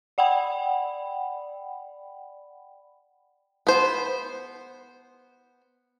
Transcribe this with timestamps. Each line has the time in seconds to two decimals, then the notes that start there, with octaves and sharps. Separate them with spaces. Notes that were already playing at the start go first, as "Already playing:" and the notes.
0.18 D5 F#5 G5 B5
3.67 B3 C5